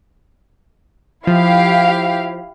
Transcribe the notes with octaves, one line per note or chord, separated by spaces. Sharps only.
F3 E4 G4 F5